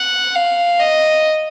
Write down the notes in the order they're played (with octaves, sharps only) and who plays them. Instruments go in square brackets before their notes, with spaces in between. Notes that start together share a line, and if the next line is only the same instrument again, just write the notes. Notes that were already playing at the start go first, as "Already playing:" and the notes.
Already playing: [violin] F#5
F5
D#5